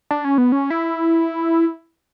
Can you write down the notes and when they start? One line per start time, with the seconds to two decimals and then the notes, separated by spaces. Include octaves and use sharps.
0.11 D4
0.25 C#4
0.38 B3
0.52 C#4
0.70 E4